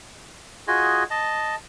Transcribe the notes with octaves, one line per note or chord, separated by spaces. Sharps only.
F4 F#4 G#4 D#5 G#5
D#5 A5